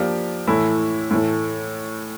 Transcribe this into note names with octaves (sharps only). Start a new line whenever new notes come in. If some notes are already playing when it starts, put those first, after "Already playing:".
Already playing: F3 A#3 D4 G4
A2 E3 A3 E4
A2 E3 A3